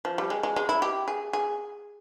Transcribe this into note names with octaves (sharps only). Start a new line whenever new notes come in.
F3
G3
G#3
G#3
G#3
E4
G4
G#4
G#4